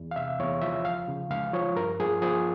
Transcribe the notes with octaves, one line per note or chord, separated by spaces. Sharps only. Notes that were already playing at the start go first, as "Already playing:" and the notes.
Already playing: E2
F5
C3 E5
E2 C#5
F3 E5
C#2 F5
C#3
C#2 F5
F3 C#5
G2 A#4
F3 G#4
F3 G#4